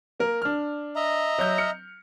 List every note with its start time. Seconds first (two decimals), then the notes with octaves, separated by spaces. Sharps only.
0.20 A#3 A#4
0.42 D4 F6
0.96 D#5 E5 A#5
1.38 F#3 G6
1.58 F6 C#7